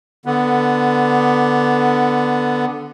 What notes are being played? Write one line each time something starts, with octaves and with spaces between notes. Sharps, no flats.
D3 B3